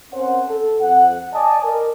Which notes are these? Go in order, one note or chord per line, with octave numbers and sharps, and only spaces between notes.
C4 C#4 A#4 C5 F#5
A4
F2 F#5
D5 D#5 G#5 A5
A#4